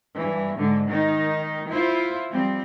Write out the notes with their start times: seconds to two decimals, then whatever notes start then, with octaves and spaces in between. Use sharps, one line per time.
0.17 G2 E3
0.58 G#2 D3
0.90 D#3 D#4
1.69 E4 F4 C5
2.29 F3 G3 C4